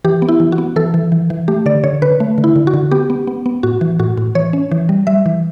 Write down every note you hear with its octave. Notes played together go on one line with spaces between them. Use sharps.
E3 G4
B3
E4
E3
F#4
B3
E3 A4
E3
E3
E3
A3 G4
D3 D5
D3 C#5
D3 B4
A3
D3
E4
D3
F#4
D3
B3 G4
B3
B3
B3
A2 F#4
E3
A2 F#4
A2
E3 C#5
C#4
E3
G3
G3 E5
E3